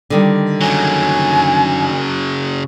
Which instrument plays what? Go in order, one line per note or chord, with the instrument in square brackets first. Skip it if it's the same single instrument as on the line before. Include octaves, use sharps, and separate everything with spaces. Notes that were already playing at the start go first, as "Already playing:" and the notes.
[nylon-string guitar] D3 D#3 G3
[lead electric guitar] C#3 F#3 [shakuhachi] G#5